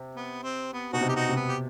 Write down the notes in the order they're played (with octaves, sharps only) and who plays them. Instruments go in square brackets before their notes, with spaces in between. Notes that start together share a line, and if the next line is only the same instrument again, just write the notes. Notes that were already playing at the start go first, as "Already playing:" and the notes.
Already playing: [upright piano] C3
[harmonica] B3
C4
B3
[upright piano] B2 [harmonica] D#4 F#4
[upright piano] C3
[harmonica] G4
D#4 F#4
[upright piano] C3
[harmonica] B3
G4